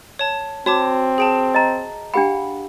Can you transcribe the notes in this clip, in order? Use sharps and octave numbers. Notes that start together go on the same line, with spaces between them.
C#5 A5
C4 F#4 C#5 A5 D6
G#4 G5 A5
D#5 A#5
D4 G4 F5 F#5 B5